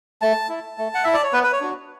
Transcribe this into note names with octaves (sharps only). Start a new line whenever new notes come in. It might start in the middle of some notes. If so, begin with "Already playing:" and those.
A3 A5
E4
A3
F#5
E4 E5
D5
C#5
B3 B4
B4
C#5
D4 F#4